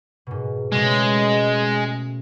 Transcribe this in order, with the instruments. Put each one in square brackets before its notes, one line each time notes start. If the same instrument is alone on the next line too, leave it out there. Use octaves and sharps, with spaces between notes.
[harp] G#2 B2
[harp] B2 A3 C#4 [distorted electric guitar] G#3